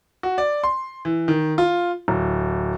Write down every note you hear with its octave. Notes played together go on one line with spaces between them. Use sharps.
F#4
D5
C6
E3
D#3
F4
D1